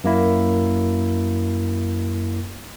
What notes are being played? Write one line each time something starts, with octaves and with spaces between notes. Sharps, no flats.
F#2 A#3 E4